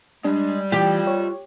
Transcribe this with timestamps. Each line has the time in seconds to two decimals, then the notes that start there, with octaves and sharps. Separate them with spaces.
0.25 G3 G#3 D4
0.72 E3 F4 G4 G5
1.07 C#5